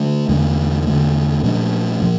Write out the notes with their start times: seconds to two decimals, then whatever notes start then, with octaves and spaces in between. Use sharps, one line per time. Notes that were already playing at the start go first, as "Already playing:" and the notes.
Already playing: D3 A3
0.29 E2 D3 A3
0.86 E2 D3 A3
1.43 A#2 F3 A3 D4
2.02 A#2 F3